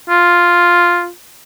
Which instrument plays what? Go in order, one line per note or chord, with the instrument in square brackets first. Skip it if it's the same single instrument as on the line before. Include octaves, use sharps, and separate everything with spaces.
[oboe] F4